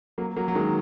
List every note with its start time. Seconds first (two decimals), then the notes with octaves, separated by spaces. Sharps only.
0.18 F#3 A#3
0.36 F#3 A#3
0.48 F#3
0.55 D#3 G#3